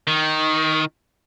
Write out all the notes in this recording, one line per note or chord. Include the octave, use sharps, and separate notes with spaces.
D#3